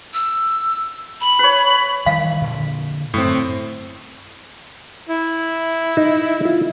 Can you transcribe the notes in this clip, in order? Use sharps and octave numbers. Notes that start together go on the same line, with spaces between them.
E6
B5
B4 C#5
D#3 E3 G3 F5
A#2 D3
F#2 A2 C4
E4
D#4
F4